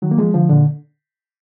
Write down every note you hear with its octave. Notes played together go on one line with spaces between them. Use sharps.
D#3 F#3
A#3
F3 G#3
D3 F3
A#2 D3